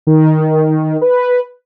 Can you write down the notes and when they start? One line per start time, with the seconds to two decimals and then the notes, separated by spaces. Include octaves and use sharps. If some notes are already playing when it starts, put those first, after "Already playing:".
0.07 D#3
1.01 B4